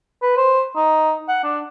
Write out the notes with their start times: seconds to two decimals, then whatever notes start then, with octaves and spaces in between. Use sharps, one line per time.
0.22 B4
0.37 C5
0.76 D#4
1.28 F#5
1.44 D4